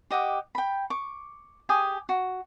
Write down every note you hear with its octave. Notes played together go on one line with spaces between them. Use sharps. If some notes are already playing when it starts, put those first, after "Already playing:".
G4 D#5 F#5 D6
G5 B5
C#6 D6
G4 G#4 G#5 D#6
F#4